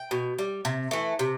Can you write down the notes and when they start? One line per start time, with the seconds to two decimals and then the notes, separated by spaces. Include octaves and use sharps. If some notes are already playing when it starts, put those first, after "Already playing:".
Already playing: G5
0.11 B2
0.39 G3
0.65 C3
0.91 E3 A3
1.19 C3